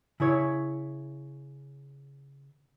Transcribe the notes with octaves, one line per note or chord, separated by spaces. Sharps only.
C#3 E4 C#5